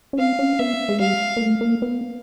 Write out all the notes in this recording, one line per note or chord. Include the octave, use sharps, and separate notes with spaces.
C#4
C4 F5
C#4
B3 E5
G#3
G3 F5
A#3
A3
A#3
B3